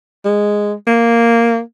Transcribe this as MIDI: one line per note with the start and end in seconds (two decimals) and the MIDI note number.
0.25 0.73 56
0.87 1.60 58